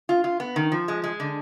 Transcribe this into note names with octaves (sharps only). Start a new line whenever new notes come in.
F4
F4
B3
D#3
F3
G#3
G#3
D3